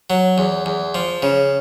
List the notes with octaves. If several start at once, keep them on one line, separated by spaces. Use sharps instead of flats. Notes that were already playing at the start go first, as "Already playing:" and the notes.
F#3
E2
E2
F3
C#3